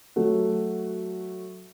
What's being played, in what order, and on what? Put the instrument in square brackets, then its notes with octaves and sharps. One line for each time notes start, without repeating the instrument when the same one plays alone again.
[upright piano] F#3 A3 F#4